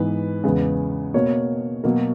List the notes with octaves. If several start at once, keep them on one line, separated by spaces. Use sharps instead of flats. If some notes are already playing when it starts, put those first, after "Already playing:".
Already playing: G#2 E3 B3 B4
E2 C#3 G#3 B3
B2 A#3 C#5
B2 F#3 A#3